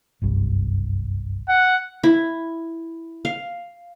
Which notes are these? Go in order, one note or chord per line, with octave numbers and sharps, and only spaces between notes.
F#1 C2 G2
F#5
E4
F5